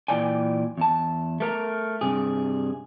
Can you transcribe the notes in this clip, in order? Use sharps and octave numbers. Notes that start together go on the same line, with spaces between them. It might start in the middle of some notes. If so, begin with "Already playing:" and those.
A#2 E3 D5 G5 G#5
E2 A5
A3 A#4 A#5
G2 C3 G#4